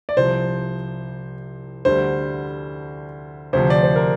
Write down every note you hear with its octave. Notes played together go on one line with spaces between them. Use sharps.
D5
C2 C3 F3 C5
D2 D3 G3 C5
D2 C3 F3 C5
D5
C5
A#4